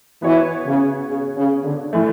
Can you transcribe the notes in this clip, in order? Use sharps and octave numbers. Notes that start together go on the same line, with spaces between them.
E3 B3 F#4 C#5
C#3
C#3
C#3
D3
A2 E3 A3